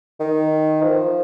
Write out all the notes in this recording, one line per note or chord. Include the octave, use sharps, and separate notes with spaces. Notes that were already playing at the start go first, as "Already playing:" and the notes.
D#3
F3